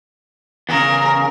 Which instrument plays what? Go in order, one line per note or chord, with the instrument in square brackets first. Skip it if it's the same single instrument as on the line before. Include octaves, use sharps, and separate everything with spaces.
[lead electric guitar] E2 C#3 [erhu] A#4